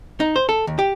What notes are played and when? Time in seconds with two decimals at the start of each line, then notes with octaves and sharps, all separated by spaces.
0.20 D#4
0.36 C5
0.49 A4
0.67 D#2
0.79 G4